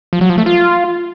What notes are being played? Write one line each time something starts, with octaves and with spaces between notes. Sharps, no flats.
F3
F#3
F3
A3
F4